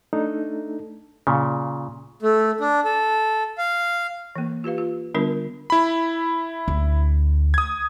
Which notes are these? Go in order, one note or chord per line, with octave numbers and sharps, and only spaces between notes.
A3 D4 D#4 A4
A#2 C#3
A3
D4
A4
F5
E3 A#3
F4 G4 B4 F5
F4
D3 G3 B3 D4 F4 A#4
E4 B5
D2
D#6 G#6